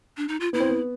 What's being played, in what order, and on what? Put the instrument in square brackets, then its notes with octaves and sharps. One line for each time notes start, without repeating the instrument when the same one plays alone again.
[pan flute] D4
D#4
F4
[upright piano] B3 [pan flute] E4
[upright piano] C4
B3